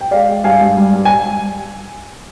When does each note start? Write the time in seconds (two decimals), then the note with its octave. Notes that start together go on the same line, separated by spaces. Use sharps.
0.01 G5
0.11 G#3 D5 F5
0.28 G#3
0.44 G2 F5 G#5
0.61 G2
0.77 G3
0.93 G2
1.05 G#5